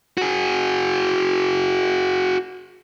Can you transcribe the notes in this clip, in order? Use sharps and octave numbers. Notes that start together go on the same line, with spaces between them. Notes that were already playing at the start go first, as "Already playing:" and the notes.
F#4 G#4